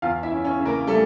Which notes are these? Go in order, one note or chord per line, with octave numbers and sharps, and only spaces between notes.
E2 F4 F5
E4 E5
C#4
C#4 C#5
C#3
A#3 A#4
G3 A3 A4